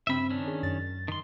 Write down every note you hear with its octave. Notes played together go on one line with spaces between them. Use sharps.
G2 C#3 C4 E5 B5
D#3 C#4 D4
G#4
F#2 A6
D#3 C6